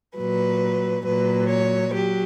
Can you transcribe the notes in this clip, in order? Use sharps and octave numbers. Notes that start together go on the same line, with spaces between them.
A#2 F#3 B4
A#2 F#3 B4
C#5
F#3 G4